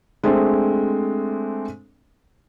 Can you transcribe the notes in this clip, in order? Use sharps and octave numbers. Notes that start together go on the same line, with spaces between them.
G#3 A3 C4 D4